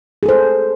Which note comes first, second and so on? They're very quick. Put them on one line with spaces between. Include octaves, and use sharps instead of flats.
G#4 A4 C5